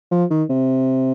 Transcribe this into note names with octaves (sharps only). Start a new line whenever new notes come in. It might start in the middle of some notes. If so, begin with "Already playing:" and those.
F3
D#3
C3